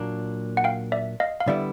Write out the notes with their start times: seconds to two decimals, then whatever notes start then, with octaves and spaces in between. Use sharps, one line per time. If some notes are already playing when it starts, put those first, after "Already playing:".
Already playing: A#2 F#3 A#3 D4
0.57 F#5
0.64 F5 G5
0.92 D5 E5
1.20 D#5 F5
1.40 F5
1.47 D3 G3 B3 E4 D5 E5